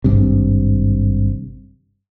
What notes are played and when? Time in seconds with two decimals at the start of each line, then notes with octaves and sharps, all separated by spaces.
0.04 G#1 G2 C3